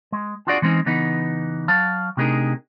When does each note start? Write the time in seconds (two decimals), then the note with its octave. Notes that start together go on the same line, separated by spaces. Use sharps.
0.12 G#3
0.47 D4 F4 F#4 G#4 D5
0.62 E3 G#3 C4 C#4 D#4
0.86 C#3 E3 B3 D#4
1.68 F#3 F5 A5
2.17 C3 A3 D4 D#4 G#4 A#4